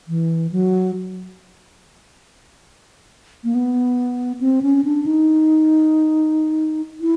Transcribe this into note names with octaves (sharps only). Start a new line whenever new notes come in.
E3
F#3
A#3
B3
C4
C#4
D4
D#4
E4